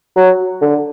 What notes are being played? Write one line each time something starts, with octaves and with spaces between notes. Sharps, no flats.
F#3
D3